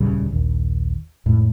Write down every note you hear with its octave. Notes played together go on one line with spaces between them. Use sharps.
D#1 C#2 C#3 G3
A#1 D#2
F2 A2 G#3 A3